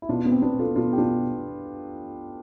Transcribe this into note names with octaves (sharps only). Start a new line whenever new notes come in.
E4
B2 D4 F4
B3 D4
C4
B3 D4
B2
F4 A4
B2 D4 F4
G4
B2 D4 F4